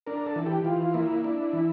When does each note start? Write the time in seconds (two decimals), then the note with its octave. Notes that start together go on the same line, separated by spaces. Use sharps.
0.07 D4 A#4
0.26 A4
0.36 E3
0.46 G4
0.65 E3 F4
0.94 A#3 E4
1.24 D4
1.53 E3